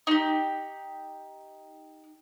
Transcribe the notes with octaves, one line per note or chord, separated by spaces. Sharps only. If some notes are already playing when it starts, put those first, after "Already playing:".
D#4 G4